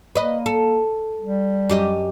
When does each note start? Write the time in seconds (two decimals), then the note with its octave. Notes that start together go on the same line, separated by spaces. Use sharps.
0.15 A#3 B4 D#5
0.46 A4
1.21 G3
1.69 F#2 G4 D#5